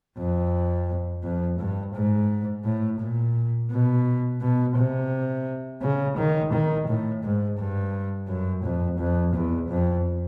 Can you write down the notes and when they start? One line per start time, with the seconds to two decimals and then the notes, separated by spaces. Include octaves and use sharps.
0.18 F2
1.23 F2
1.59 G2
1.94 G#2
2.64 A2
3.00 A#2
3.70 B2
4.41 B2
4.76 C3
5.82 C#3
6.17 D#3
6.52 D#3
6.87 A2
7.22 G#2
7.58 G2
8.28 F#2
8.63 F2
8.99 F2
9.34 E2
9.69 F2